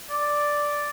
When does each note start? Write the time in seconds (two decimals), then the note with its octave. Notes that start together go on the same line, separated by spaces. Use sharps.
0.10 D5